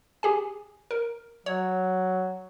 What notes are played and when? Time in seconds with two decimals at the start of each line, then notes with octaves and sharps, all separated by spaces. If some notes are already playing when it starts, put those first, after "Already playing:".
0.23 G4 G#4 G#5
0.91 A#4
1.46 F#3 C#5